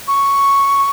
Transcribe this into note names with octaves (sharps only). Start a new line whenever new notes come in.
C#6